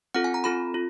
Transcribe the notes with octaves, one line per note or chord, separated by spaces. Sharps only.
C4 F4 A4 F#5
G#5
A#5
C4 F4 A4 B5
F4